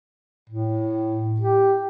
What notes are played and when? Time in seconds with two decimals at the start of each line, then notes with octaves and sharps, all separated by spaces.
0.49 A2
1.40 G4